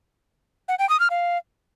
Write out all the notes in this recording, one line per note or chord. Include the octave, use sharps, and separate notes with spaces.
F#5
G5
D#6
F6
F5